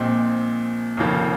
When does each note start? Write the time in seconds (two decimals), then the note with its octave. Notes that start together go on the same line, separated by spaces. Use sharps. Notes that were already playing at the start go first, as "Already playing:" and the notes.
Already playing: A#1 A#2 G#3 C4
0.97 F1 D#2 C#3 F3 A#3